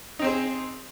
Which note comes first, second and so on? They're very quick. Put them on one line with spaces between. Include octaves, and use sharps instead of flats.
D#4 C4 C5 G#4